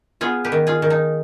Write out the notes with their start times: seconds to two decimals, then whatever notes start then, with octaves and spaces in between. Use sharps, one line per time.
0.21 B3 F4 G#4
0.44 G4 B4
0.52 D#3
0.67 F4 G#4
0.82 D#3
0.90 D#4